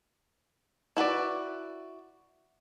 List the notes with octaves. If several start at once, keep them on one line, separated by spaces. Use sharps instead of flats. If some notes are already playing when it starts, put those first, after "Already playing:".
E4 F#4 B4 D5